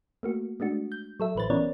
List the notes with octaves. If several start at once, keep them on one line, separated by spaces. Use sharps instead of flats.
A3 A#3 F#4
G#3 A3 D4 F#4
G6
F#3 A4 E5
A1 E3 B4 C5 A6
E3 B3 C#4 A#4 C#5 D5